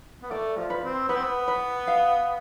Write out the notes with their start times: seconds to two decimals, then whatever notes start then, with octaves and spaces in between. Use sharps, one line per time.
0.22 B3
0.31 A3 D5
0.57 F3
0.70 B4
0.84 C4
1.09 B3 B4
1.16 C4
1.24 B3
1.48 B4
1.87 F5